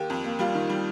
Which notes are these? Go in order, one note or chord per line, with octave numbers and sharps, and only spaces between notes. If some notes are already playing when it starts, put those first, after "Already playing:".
Already playing: D#2 A#3 G4
F2
A#3
G3 F4
D#3
G3